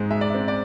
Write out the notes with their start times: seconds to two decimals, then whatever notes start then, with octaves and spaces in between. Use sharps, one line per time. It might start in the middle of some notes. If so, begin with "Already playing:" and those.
Already playing: G#2 G#3 C4
0.10 G#3 E5
0.21 D5
0.30 C4 E5
0.48 D5